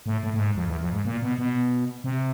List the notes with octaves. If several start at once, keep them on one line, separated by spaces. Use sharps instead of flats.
A2
A2
A2
G#2
F2
E2
F2
G#2
A#2
B2
B2
C3